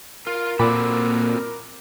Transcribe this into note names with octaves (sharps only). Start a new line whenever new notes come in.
F4 A#4
A#2 C4 F#4 A4 B5 D6